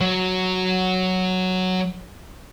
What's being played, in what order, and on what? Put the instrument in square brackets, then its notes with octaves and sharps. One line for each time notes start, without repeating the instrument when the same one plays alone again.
[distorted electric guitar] F#3